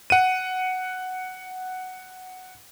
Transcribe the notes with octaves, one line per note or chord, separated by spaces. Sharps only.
F#5 D#7